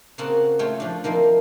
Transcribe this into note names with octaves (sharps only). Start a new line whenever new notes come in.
C#3 A#3 C4 F#4 F#5 A5
A3 F4 C#5 G5
F3 D4
D#3 F3 A#3 C4 E4